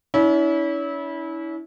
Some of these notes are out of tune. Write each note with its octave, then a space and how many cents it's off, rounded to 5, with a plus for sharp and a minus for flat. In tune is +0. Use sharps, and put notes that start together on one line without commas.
C#4 +40 E4 -25